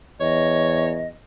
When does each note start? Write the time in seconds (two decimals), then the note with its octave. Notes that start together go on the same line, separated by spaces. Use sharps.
0.20 E2 C#5 D#5